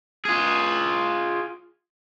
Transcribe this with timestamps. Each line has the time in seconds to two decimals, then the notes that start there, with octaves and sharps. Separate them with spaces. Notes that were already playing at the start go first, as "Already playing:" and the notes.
0.25 F4 G#4